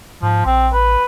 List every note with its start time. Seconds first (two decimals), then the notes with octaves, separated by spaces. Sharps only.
0.23 G#2 F3
0.46 A#1 C4
0.73 A1 B4